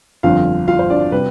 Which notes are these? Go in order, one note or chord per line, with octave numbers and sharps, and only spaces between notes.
G1 F2 D3 F3 F4 F5
F4 F5
C5
D4 D5
C3 G3 B4